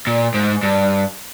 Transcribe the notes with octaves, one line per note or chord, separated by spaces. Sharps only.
A#2
G#2
G2